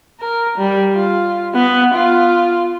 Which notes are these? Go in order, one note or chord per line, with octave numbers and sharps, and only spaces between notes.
A#4
G3
F4
B3
F4